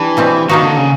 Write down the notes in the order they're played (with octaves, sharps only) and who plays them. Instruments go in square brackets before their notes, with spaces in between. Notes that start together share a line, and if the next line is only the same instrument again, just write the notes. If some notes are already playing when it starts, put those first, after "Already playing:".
Already playing: [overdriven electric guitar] E3 [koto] D4 G4
[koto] B2 G3 C4
[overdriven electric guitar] D#3 [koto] A#3 D#4 F#4
[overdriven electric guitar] D3
C#3